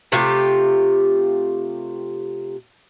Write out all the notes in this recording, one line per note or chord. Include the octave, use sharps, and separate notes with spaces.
C3 A3 F4 G4